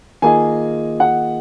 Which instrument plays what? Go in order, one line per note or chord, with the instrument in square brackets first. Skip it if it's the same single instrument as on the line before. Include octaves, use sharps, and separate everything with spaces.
[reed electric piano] D#3 A#3 F4 G#4 D#5 [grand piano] G#5
[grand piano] F#5